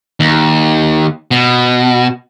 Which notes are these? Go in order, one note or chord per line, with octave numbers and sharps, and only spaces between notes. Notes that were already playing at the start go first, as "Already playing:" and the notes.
D#2
B2